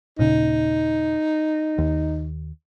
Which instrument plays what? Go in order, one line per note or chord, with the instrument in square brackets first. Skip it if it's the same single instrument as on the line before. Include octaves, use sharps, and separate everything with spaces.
[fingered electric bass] D#1 A#2 C#3 [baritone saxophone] D#4
[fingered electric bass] D#2